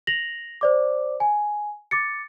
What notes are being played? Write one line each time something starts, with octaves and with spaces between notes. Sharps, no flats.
A#6 F7 F#7
C5 D5 D6
G#5
D6 A6 C#7